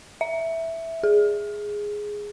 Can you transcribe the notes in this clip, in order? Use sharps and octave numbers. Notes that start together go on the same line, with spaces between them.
E5
G#4